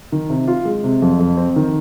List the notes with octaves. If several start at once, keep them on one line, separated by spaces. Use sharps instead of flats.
D#3
C3
F4
G#3
C3
F2
F2
C4
D#3